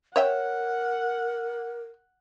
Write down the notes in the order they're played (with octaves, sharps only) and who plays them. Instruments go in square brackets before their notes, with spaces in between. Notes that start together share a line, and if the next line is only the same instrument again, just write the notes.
[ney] A#4 [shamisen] C#5 E5 G5 [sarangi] F#5